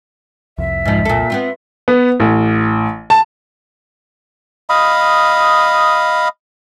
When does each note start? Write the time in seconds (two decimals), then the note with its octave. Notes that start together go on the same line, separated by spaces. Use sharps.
0.58 C2 F2 E5
0.85 G#2 F3
1.05 A#2 A4
1.30 B3 C4 F4
1.88 B3
2.20 A1
3.10 A5
4.70 D#5 F5 B5 D#6